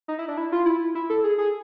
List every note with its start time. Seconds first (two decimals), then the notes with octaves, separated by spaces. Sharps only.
0.08 D#4
0.19 E4
0.28 D4
0.37 E4
0.52 F4
0.66 E4
0.95 E4
1.10 A4
1.24 G#4
1.38 G#4